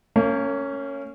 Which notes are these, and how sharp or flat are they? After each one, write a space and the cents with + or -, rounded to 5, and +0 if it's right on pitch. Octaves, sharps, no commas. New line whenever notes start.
A#3 -35 C#4 +0